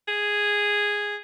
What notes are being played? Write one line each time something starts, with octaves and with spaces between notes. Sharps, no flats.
G#4